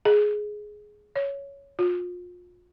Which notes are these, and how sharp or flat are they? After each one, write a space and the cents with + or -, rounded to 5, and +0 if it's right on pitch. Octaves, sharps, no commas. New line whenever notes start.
G#4 +10
C#5 +10
F4 +30